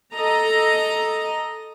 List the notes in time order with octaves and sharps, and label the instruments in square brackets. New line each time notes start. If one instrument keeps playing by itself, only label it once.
[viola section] A4 D#5 A#5